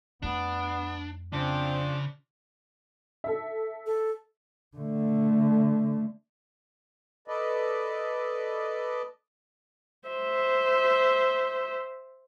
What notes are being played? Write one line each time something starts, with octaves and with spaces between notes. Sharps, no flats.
F2 A3 B3 D4
C#3 F3 C4 D4
A4 E5
A4
D3 A3
A4 B4 D5 D#5
C5 E5